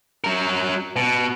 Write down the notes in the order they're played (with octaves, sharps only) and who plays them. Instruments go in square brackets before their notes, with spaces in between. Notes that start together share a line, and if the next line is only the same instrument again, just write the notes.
[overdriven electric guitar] F#3 A#4
B2